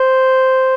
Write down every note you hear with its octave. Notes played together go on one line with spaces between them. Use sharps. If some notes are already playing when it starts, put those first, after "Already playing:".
Already playing: C5